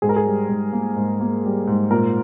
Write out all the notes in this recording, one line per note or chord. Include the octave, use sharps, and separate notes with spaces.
G#2 G#4
A#4
G#4
G3
G#2
A#3
G#2
A#3
G3
G#2
A#2 A#4